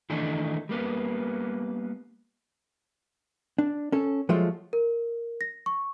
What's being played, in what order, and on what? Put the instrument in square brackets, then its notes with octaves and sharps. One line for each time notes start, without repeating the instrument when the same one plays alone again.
[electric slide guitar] D#3 E3 A3 D4 D#4
G3 A#3 B3
[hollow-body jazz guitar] D4
C#4 A4
F3 F#3 G#3 A3 F4
[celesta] A#4
A#6
C#6